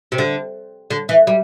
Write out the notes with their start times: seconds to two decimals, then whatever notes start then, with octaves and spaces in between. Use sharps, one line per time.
0.12 C3
0.18 D3
0.90 D3
1.09 E3
1.27 G3